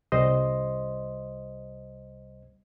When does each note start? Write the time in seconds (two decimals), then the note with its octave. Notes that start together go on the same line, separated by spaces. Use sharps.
0.12 C2 G3 C5 D#5 C6